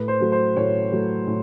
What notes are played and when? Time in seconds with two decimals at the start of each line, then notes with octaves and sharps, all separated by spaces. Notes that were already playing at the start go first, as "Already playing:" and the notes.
Already playing: A2 B4
0.08 C5
0.20 F#3 A3
0.32 C5
0.57 A2 C#5
0.93 F#3 A3
1.27 A2